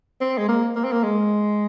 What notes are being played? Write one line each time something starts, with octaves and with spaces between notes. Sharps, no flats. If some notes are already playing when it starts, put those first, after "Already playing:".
C4
G#3
A#3
A#3
C4
A#3
G#3